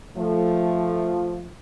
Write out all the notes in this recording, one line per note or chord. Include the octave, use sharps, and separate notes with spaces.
F3 A3